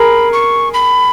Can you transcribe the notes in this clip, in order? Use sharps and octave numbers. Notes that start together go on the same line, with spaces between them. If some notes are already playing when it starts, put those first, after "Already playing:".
Already playing: G#4 A#4 B5
C#6
B5